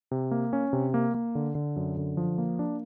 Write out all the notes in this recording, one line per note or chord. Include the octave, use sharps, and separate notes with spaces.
C3
A#3
C#4
C3
A#3
A#3
D3
D3
F#2
D3
F3
A#3
D4